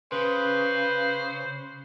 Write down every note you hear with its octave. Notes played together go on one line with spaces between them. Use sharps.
C#3 B4 C5